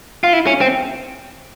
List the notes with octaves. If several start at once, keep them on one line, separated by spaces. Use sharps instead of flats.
F4
E4
C#4
C4